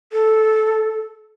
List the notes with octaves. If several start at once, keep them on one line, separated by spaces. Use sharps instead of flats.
A4